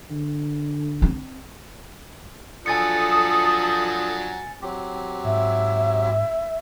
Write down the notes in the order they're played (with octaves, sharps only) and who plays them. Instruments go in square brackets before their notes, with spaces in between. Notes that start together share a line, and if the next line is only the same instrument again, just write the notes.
[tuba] D3
[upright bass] C4
[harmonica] F3 F#3 D4 [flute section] A4 D#6 [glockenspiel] G#5 A6 C#7
[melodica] F#3 C4 G4
[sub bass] G#2 [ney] E5